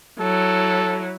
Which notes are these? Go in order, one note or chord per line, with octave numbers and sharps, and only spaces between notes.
F#3 E4 A4